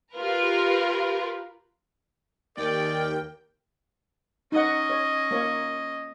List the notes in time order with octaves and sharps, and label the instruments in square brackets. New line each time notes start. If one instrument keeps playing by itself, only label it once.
[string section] F4 G4 A#4 B4
[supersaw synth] D#2 G5 [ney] A#4 [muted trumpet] D5
[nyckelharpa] C#4 D#5 [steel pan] D#4 F#5
[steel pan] C#5
A#3 C#5